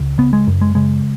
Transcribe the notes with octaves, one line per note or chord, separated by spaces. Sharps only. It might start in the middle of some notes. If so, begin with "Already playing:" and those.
Already playing: C#2
C#3 B3
G#3
F#2
G#3
C#3 G#3